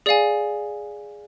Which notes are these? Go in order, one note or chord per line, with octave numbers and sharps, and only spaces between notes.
G#4 D5 F5 G#5